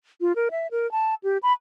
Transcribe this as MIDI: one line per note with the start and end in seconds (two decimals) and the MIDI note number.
0.21 0.35 65
0.36 0.49 70
0.51 0.67 76
0.71 0.90 70
0.92 1.14 81
1.24 1.38 67
1.43 1.53 83